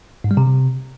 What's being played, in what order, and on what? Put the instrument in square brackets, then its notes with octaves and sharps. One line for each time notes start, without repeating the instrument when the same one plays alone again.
[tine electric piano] G#2
G3
C3